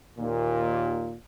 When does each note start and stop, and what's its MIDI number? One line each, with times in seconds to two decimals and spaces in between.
0.18 1.13 39
0.18 1.13 46